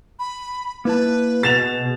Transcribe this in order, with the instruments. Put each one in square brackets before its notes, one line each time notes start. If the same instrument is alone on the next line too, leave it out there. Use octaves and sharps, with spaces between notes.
[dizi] B5
[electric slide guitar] A#3 E4 A5 [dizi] B4
[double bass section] B2 [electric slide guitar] B3 G#4 [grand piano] A6 E7 F7